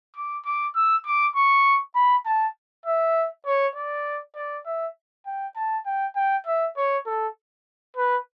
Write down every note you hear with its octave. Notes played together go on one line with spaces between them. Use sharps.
D6
D6
E6
D6
C#6
B5
A5
E5
C#5
D5
D5
E5
G5
A5
G5
G5
E5
C#5
A4
B4